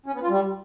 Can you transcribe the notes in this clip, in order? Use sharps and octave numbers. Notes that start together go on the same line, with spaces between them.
C#4
B3
F4
G3